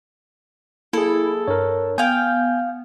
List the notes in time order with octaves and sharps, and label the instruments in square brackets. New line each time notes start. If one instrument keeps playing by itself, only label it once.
[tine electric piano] A#3 G#4 [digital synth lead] E4 [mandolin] A4
[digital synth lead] G2 [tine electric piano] A#4 C#5
[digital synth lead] B3 [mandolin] F5 G5 [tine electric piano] G#5 G6